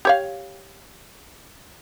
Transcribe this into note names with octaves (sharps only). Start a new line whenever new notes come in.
G4 C#5 F5